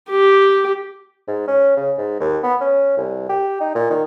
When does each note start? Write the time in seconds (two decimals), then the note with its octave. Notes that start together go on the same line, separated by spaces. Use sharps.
0.11 G4
1.28 G#2
1.47 C#4
1.76 C#3
1.98 G#2
2.20 D#2
2.43 B3
2.60 C#4
2.97 C2
3.29 G4
3.60 D#4
3.75 A#2
3.90 D#3